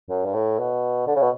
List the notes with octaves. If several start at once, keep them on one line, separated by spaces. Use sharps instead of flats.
F#2
G2
A2
B2
D3
C#3
B2